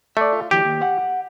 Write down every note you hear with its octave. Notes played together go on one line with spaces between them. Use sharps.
A3 D5 E5
F4
D2 E3 F#3 G4
D#2
F#5